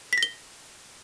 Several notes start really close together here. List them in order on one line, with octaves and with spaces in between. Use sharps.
B6 A#6 G7